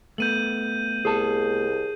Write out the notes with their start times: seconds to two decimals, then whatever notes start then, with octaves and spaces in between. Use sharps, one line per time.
0.18 A3 B3 G6 D#7 F#7
1.05 C2 G#4 A5